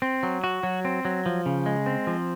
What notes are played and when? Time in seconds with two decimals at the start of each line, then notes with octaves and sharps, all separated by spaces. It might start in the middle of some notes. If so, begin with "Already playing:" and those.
0.02 C4
0.23 F#3
0.44 F#4
0.63 F#3
0.85 C4
1.05 F#3
1.26 F3
1.46 C#3
1.66 G#3
1.86 C4
2.07 F3